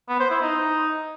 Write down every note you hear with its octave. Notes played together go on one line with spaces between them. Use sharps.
B3
C5
E4
D#4